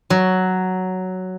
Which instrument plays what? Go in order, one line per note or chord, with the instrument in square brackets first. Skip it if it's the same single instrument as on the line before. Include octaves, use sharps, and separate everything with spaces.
[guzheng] F#3